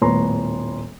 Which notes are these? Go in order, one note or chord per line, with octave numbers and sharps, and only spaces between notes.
D#1 A2 B3 C#5 A#5 C6